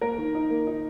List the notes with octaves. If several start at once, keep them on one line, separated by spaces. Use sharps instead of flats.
A#3 A#4
D#3
D#4
A#3
D#4